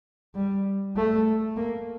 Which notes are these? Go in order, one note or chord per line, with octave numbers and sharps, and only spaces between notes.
G3
A3
A#3